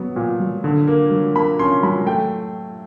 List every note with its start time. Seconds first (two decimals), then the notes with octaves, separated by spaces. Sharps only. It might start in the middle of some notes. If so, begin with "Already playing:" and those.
Already playing: F#3 B3
0.16 A#2
0.40 F#3
0.64 D3
0.87 A#3
1.11 F#3
1.35 A#3 B5
1.59 C#4 C6
1.83 F#3 B5
2.06 A3 G5